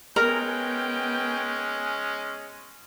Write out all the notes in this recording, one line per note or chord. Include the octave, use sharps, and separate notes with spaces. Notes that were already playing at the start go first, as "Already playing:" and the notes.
G#3 B3 C#4 A#4 G5